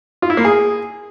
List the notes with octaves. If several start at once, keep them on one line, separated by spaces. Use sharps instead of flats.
F4
E4
A#3
G#4